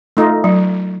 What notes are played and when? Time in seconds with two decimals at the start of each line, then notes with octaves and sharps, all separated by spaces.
0.17 A3 D#4 F4
0.44 F#3